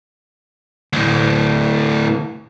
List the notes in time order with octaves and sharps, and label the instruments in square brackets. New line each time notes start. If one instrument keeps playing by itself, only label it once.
[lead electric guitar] D2 A2